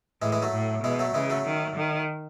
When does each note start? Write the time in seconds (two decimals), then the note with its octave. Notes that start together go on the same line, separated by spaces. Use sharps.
0.22 A2 E3 G#3
0.32 E3 G#3
0.42 F#3 A3
0.53 A2
0.84 B2 E3 G#3
0.99 F#3 A3
1.14 C#3 E3 G#3
1.30 F#3 A3
1.45 D#3
1.77 D#3